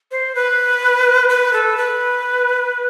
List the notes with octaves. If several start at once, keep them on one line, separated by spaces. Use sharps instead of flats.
C5
B4
B4
A4
B4